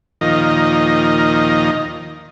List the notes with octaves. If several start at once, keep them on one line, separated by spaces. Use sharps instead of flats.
D#2 A#2 D#3 F3 D#5 A#5